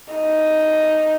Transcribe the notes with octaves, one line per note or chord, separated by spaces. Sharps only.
D#4